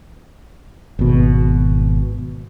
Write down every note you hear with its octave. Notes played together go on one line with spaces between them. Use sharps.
G#1 B2